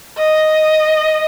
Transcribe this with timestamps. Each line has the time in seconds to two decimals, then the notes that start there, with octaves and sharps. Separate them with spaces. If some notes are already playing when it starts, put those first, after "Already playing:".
0.18 D#5